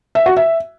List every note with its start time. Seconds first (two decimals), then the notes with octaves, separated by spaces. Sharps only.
0.15 E5
0.26 F#4
0.37 E5